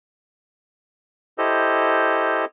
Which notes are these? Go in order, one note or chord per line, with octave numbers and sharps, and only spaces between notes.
E4 G4 A4 C5 D#5